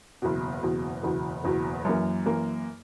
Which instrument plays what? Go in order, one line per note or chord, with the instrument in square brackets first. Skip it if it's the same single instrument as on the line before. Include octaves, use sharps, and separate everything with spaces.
[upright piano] F#1 E2 B2
F#1 E2 B2
F#1 E2 B2
F#1 E2 B2
F#2 E3 A#3
F#2 E3 A#3